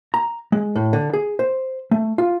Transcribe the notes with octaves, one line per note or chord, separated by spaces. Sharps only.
A#5
G#3
A2
D3
G#4
C5
A3
F4